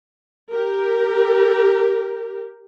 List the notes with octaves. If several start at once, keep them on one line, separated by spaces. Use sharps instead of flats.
G4 A#4